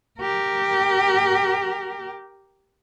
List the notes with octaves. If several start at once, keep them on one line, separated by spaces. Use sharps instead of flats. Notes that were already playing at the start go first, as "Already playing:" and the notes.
G4 A#4